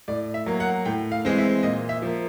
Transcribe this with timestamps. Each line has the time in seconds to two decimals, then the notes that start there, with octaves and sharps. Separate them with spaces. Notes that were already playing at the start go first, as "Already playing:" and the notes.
0.08 A2 D5
0.34 E5
0.46 F#3 A#3
0.60 F#5
0.85 A2 G5
1.12 F5
1.25 E3 G#3 C4
1.38 E5
1.63 A#2 D#5
1.89 E5
2.02 F3 A#3